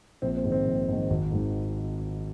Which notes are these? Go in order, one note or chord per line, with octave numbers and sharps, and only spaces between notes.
A#1 C4
C4
G#2 D#3
C4
A#1
G#2 D#3
G#1
G#2 D#3